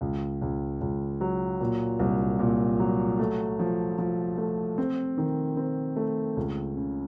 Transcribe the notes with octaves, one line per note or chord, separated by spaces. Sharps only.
C#2
C#2
C#2
F#3
A#2
C2
A#2
F#3
A3
F3
F3
A3
C4
D#3
C4
A3
C#2
C#3